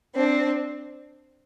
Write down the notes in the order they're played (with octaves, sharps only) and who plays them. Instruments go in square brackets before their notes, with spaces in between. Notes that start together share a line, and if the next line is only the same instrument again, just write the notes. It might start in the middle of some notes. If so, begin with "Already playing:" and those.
[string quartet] C4 D4